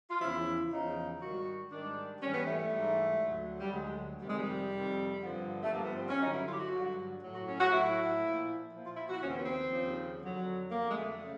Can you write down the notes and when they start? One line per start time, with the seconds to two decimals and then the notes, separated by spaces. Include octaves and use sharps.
0.11 F4
0.21 E2 C#3 F3 E4
0.71 E2 C#3 F3 D#4
1.21 G#2 D#3 G3 F#4
1.71 G#2 D#3 G3 D4
2.21 G#2 E3 G3 C#4
2.34 B3
2.46 A3
2.59 A3
2.71 G#2 E3 G3
3.22 D2 D3 F#3
3.60 G3
3.71 D2 D3 F#3 G#3
4.21 F2 C3 D#3 G3
4.30 G#3
4.38 G3
4.71 F2 C3 D#3
5.21 G2 D3 F3
5.63 A3
5.71 G2 D3 F3 A#3
5.84 B3
5.97 C4
6.09 C#4
6.21 G2 D3 F#3 D#4
6.34 E4
6.47 F4
6.53 G4
6.59 F#4
6.71 G2 D3 F#3
7.21 A2 F#3
7.34 F#4
7.46 C#4
7.59 F#4
7.72 A2 F#3 E4
8.22 A#2 F3
8.71 A#2 F3
8.84 F4
8.97 E4
9.09 F#4
9.21 D#2 C#3 F3 C#4
9.30 C4
9.37 B3
9.46 C4
9.71 D#2 C#3 F3
10.22 F2 D3 F#3
10.71 F2 D3 F#3 A#3
10.90 G#3
10.97 A3
11.23 C#3